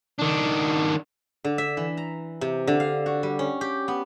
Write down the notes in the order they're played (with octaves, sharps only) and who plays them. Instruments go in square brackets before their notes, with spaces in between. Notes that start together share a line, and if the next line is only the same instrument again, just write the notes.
[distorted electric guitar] D#3 D4
[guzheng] D3
E5
E3
A#5
C3
D3
F5
F#4
G3
C#4
G4
B3